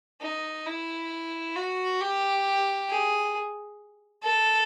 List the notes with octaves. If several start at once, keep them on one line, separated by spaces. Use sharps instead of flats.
D#4
E4
F#4
G4
G#4
A4